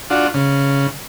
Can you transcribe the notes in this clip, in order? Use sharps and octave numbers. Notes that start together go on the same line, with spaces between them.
D4 F4 F#4
C#3